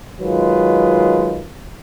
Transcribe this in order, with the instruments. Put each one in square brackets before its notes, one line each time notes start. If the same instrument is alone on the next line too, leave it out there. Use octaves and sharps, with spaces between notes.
[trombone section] D#3 F#3 G#3 F4 B4